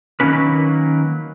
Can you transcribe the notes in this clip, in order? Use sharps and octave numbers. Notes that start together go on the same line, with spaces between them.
D#3 F#3 A#3 C#4 B4